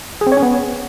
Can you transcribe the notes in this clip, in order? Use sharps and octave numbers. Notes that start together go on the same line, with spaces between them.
G#4
C4
C#5
C#4
B3